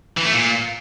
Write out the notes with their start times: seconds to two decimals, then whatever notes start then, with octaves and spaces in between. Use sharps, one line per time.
0.17 E3
0.25 A3
0.33 A#2